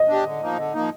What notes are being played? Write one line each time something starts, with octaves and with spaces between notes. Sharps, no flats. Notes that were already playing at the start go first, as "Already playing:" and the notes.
Already playing: D#5
D4 G4
D3
F3 A#3 D#4
D3
F3 A#3 D#4